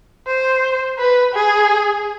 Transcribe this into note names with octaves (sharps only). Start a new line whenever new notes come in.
C5
B4
G#4